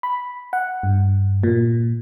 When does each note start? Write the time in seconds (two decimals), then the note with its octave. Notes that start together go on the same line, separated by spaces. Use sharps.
0.03 B5
0.53 F#5
0.83 G2
1.43 A#2